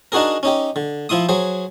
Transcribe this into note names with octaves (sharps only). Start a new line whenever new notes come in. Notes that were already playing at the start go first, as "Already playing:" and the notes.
D4 D#4 F#4 G#4 A#4
C#4 D#4 G4
D3
F3 E4 C6 D#6
F#3 G#4 C5